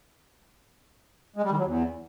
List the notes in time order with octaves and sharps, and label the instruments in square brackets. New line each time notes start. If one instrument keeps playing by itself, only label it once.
[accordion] G#3
G3
D#3
F#3
E2